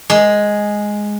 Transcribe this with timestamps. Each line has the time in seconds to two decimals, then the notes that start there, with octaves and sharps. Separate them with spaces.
0.10 G#3